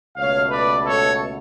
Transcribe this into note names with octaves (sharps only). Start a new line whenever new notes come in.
C#2 B2 A3 C#5 F5
B4 D5
A4 C#5